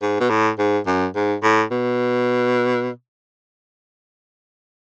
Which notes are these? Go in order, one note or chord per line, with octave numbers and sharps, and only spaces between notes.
G#2
B2
A2
G#2
F#2
G#2
A2
B2